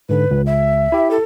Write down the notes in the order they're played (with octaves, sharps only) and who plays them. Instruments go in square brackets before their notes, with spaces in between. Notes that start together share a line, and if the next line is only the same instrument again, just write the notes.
[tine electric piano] G#2 D3 [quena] B4
[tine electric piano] C#2
[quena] E5
[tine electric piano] E4 G4
[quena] A4